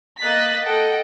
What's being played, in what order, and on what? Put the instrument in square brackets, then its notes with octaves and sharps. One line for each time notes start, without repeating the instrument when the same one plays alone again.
[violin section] A#3 D#5 F#6 A6 B6
A4 D#5 F#5 G5